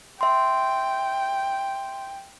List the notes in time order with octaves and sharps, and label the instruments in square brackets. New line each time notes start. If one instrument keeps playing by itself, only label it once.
[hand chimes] E5 C6 [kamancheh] G5